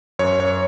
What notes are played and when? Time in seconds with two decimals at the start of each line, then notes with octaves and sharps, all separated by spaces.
0.19 F#2 C#5
0.40 C#5